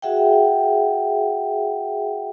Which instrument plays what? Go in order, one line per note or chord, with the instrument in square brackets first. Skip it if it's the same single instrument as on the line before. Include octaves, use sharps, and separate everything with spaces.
[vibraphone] F#4 G#4 E5 F#5 G5